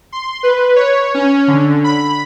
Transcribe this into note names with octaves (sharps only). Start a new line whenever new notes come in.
C6
B4
C#5
C#4
D3
B5